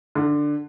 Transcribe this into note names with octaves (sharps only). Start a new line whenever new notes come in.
D3